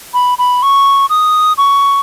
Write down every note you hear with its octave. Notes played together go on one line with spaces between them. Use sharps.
B5
B5
C#6
D#6
C#6